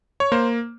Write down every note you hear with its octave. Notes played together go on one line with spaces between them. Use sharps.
C#5
A#3 C5